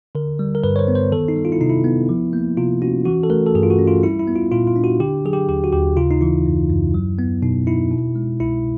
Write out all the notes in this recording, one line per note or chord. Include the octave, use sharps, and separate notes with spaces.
D3 A#4
G3
A#4
G2 B4
C#5
C5
B3
C5
D#3 A4
D#4
G3
F4
E4
C3 D#4
E4
B3
F3
A#3
C3 F4
C#4 F#4
E3 F#4
A4
A3 A#4
A4
G2 G#4
F4
F#4
C#4
F4
G3 E4
E4
B3
F4
A#2 F4
F4
D4
F#4
D3 G4
F#3 G#4
G4
D#2 G4
F#4
D#2 G4
C#3 F4
D#4
E3 E4
F#2
F#2
F#3
B3
B2 D#4
D#4 E4
B2
G#3
C2 E4